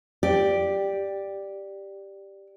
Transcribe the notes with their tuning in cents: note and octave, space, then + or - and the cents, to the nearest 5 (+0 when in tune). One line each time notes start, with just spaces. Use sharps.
G4 +0 D5 +5